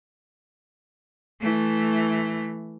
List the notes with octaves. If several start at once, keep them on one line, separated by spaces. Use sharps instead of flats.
E3 A3